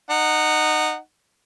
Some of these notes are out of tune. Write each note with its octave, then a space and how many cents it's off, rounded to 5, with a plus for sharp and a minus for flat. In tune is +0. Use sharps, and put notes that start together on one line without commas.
D#4 -20 F#5 +0